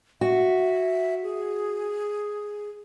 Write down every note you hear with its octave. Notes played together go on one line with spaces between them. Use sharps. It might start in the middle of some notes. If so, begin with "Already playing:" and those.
F#4 E5
G#4